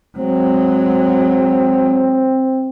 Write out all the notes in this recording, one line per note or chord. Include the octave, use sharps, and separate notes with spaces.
F#3 G#3 C4